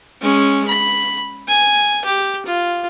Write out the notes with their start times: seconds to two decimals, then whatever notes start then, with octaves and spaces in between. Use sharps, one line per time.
0.22 G#3 C#4
0.68 B5
1.48 G#5
2.05 G4
2.46 F4